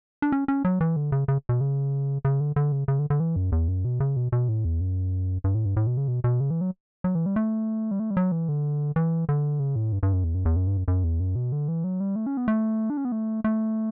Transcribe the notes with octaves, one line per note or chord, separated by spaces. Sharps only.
D4
C#4
C#4
F#3
E3
D3
C#3
C#3
B2
C#3
C#3
D3
D3
C#3
C#3
D3
D3
E3
F#2
E2
F#2
B2
C#3
B2
B2
A2
E2
F#2
G2
A2
G2
A2
B2
C#3
B2
B2
C#3
E3
F#3
F#3
E3
G3
A3
G3
A3
G3
F#3
E3
D3
E3
D3
C#3
A2
G2
G2
F#2
E2
F#2
E2
F#2
G2
F#2
F#2
E2
F#2
B2
D3
E3
F#3
G3
A3
C#4
B3
A3
D4
C#4
B3
A3
A3